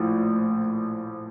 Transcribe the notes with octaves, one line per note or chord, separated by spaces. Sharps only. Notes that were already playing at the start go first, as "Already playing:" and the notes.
Already playing: A#1 A2 F3